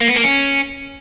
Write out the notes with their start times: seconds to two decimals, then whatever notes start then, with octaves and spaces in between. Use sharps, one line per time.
0.01 A#3
0.08 B3
0.16 A#3
0.24 C#4